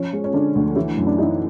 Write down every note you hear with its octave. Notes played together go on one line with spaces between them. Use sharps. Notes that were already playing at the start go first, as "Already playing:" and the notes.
Already playing: F3 C#4
G#3
C#4
D3 D4
D2
E3 E4
F#2
D4
E3 D#4